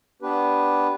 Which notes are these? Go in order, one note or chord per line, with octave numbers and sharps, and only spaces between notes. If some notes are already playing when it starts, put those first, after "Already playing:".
B3 D4 G4 B4